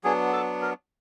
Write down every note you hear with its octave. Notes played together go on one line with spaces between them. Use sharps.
F#3 B3 D4 G#4
A4
A#4